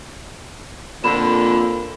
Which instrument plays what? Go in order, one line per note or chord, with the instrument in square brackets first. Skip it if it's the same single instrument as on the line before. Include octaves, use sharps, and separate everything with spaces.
[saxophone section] F2 D3 [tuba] A#2 [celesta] B5 E7